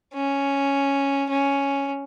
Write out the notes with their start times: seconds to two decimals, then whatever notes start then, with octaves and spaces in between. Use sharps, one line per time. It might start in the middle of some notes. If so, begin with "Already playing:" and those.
0.14 C#4
1.29 C#4